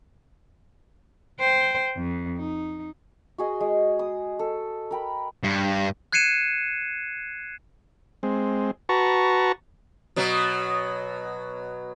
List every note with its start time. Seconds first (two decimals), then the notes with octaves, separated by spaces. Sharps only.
1.40 C5 G5
1.97 F2
2.37 D#4
3.38 F#4 G#4 D#5
3.61 G#3
3.99 D#6
4.39 A4
4.91 A#4 G5 B5
5.44 G2
6.12 F#6 G#6 C7 C#7 D#7 E7
8.23 G#3 C4
8.89 F#4 B4 A5 A#5 C#6
10.16 B2 F#3